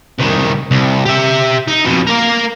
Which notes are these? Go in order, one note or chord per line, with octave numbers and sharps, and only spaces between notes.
C2 D#3
C2
G4 E5
D#4
F2 B2
A#3 A#4